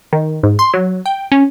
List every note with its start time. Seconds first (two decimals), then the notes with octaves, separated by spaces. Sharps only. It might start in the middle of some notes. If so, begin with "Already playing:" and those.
0.13 D#3
0.43 G#2
0.59 C6
0.74 F#3
1.06 G5
1.32 C#4